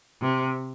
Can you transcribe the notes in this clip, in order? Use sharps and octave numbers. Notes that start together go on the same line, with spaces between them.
C3